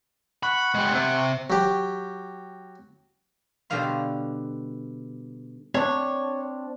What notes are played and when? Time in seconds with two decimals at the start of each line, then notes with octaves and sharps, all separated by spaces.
0.43 F#5 B5 C#6
0.75 G3 G#3
0.93 C3
1.50 F#3 G4
3.70 B2 D3 G3 D5 F5 C6
5.74 C4 D4 C#5